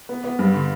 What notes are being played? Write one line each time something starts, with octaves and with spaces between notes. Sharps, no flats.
B3
B3
G2
D3